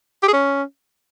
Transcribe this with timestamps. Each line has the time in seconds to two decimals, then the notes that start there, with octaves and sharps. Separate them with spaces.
0.23 G4
0.28 G#4
0.33 C#4